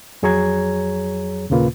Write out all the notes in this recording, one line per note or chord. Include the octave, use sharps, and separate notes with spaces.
F2 F#3 G#4 C#5 A#5 G#6
D#2 A#2 C#3 A#3 F4 B4